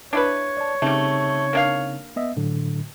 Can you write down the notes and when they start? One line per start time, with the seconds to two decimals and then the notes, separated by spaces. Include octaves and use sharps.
0.13 D4 E4 B4 C#5
0.57 D5 A5
0.82 C#3 G3 A3 C4 D#4
1.53 A#3 D4 F5
2.16 B3 D#5 E5
2.36 A2 D3 F#3